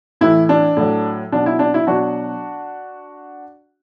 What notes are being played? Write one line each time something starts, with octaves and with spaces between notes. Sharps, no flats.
A2 E3 E4
D4
A2 F#3
B2 F#3 D4
E4
D4
E4
B2 F#3 D4 F#4